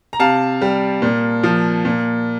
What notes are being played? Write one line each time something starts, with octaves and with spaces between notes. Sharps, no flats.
A#5
C3 F5 A5
G3
A#2
F3
A#2